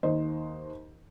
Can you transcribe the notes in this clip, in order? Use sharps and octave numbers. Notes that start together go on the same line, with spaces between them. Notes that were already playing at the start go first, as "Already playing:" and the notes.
D#2 C5 D#5